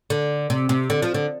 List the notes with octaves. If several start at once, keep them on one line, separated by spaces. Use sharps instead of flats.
D3
C3
C3
D3
F3
D3